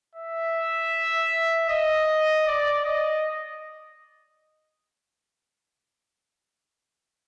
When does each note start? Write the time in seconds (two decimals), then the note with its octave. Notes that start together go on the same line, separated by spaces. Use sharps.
0.15 E5
1.69 D#5
2.47 D5
2.85 D#5